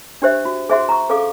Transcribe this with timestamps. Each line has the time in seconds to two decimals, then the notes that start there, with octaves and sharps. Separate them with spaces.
0.22 D4 G4 C5 E5
0.45 F#4
0.70 G#4 C5 E5 F#5 C6
0.89 A#5 C#6
1.09 C#4 G#4 A4 F5 D6